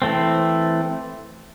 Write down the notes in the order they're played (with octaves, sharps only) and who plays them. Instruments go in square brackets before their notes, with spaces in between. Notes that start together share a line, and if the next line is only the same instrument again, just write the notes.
[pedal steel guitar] E3 A3 C4